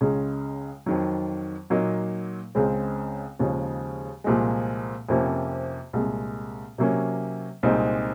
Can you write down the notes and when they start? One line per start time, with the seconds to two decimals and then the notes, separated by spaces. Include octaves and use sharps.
0.01 C#2 C#3 G#3 C#4
0.86 F2 D#3 F#3
1.70 A#2 F#3 A#3 D#4
2.55 C#2 C#3 G#3 C4
3.39 D#2 C#3 F3 G#3
4.24 C2 A#2 F3 G#3
5.09 F2 C3 F3 A#3 C#4
5.93 C2 A#2 G#3
6.78 C3 F#3 A#3 C#4
7.63 C2 A#2 G#3 C4 D#4